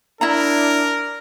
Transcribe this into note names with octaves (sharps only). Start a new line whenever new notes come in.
D4 E4 A#4 E5 A#5